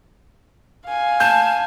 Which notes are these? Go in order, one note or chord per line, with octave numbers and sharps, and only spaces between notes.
F5 G#5
A5 G6